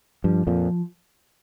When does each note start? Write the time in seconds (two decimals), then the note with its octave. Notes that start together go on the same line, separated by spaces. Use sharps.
0.24 G2 F3
0.47 F2 A#2 F3